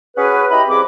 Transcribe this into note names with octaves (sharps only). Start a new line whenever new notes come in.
C#4 F#4 G#4 B4
E4 G4 D#5 A#5 B5
C2 F3 C4 G#4 B5 D6